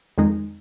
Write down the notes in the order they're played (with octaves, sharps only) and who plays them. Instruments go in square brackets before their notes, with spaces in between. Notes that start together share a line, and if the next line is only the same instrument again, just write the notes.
[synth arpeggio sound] F2 D#3 G#3 D#4